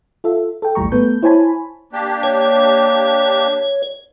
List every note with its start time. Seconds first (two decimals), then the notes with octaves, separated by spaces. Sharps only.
0.24 F4 A4 E5
0.62 A4 G5
0.75 A1 D#2 A2 G3 A#5 C#6
0.92 A3 B3 A4 B4 G6
1.22 E4 C5 C#5 G#5 A5 B5
1.93 A#3 D4 G4
2.23 C#5